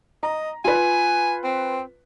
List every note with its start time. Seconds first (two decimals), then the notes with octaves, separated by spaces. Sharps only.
0.23 D#5 A#5
0.65 F4 B4 G#5
1.43 C4